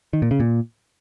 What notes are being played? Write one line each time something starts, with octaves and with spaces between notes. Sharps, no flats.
D#3
A#2
C#3
A#2